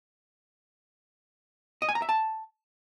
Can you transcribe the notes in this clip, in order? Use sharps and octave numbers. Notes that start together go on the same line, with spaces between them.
D#5
G#5
A#5
E5
A5